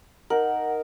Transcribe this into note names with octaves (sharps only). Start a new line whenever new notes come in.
D#4 A#4 F#5